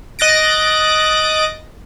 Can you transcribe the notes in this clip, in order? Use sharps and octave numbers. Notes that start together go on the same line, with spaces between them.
D#5 F#6 A6 A#6 D7